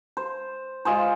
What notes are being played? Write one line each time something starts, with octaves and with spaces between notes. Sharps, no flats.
C5
G#3 F4 G#4 C5